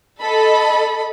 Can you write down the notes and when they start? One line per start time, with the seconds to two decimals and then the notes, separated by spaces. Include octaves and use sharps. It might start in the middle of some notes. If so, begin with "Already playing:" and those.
0.22 A4 D#5 B5